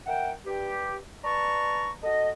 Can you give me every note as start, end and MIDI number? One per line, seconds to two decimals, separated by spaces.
0.07 0.31 70
0.07 0.31 76
0.07 0.31 78
0.07 0.31 79
0.46 0.96 43
0.46 0.96 67
1.24 1.91 71
1.24 1.91 74
1.24 1.91 81
1.24 1.91 82
1.24 1.91 85
2.03 2.30 66
2.03 2.30 69
2.03 2.30 75